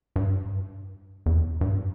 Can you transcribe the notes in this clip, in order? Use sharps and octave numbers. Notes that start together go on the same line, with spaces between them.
G2
E2
F2
G2